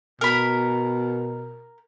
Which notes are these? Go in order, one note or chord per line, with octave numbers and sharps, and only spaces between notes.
B2 A#4 B5